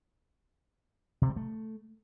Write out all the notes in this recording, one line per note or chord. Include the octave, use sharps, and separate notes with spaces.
C3
G3
A3